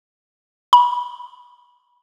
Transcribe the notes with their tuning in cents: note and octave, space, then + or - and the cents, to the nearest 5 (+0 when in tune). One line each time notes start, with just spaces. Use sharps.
B5 -25